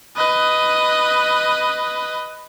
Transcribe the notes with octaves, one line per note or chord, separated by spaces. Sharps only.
B4 D#5